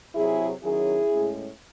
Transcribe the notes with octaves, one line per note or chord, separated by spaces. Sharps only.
C3 F#3 C4 E4 G#4
D#3 F#3 C#4 E4 G#4
A2 G#3 C#4